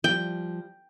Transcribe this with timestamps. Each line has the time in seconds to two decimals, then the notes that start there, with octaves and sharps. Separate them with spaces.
0.04 F3 G3 G5